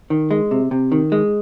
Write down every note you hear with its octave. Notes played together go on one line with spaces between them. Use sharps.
D#3
G#3
C3
C3
D#3
G#3